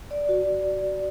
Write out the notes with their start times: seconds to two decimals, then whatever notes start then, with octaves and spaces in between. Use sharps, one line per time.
0.11 D5
0.29 F#4